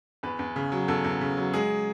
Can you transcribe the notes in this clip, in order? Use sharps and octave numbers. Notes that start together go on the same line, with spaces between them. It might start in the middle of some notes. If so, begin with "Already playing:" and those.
E2 B4
E2
C#3
F#3
E2 A4
E2
C#3
F#3
G#3 G#4